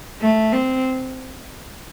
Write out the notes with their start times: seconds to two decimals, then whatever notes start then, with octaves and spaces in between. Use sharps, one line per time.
0.22 A3
0.53 C4